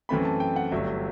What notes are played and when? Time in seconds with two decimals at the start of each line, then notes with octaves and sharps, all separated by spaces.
0.09 F#2 E3 A3 C4 B5
0.25 A5
0.40 G5
0.56 F#5
0.72 G1 G2 F#3 A3 E5